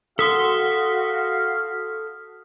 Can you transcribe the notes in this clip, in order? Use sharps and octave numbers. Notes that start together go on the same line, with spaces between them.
F#4 A4 F5 C6 D#6 B6